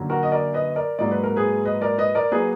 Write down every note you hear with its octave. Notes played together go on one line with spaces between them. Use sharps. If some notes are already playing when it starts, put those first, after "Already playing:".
Already playing: F#2 D3 F#3 A#3
F#4 A#4
D#5
A#4 D5
B4 D#5
A#4 D5
G#2 F#3 A#3 D5
B4
A#4
G#4 B4
B4 D#5
A#4 D5
B4 D#5
A#4 D5
F#3 A#3 G#4 B4